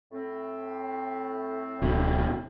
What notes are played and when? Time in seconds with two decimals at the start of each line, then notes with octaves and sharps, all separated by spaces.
0.12 A2 C4
1.82 D1 B2